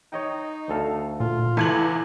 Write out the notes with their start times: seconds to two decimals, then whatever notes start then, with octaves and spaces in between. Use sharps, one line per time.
0.13 D#4 C#5 D#5 G5
0.69 D2 A4 F5
1.20 A#2 F4
1.57 E2 E4 A4 B4 G#6 F#7